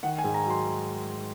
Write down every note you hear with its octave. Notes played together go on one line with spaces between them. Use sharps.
D#3 F#5
G#5
G#2
A#5
F#3
C6